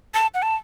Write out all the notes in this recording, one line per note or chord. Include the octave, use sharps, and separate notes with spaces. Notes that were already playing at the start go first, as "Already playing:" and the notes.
A5
F#5
A5